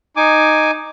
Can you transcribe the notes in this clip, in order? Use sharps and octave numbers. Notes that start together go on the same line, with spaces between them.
D#4 G#5 D6